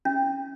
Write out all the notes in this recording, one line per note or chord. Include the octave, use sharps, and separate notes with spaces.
C#4